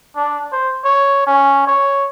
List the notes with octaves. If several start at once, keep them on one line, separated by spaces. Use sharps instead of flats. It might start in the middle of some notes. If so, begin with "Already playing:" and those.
D4
C5
C#5
C#4
C#5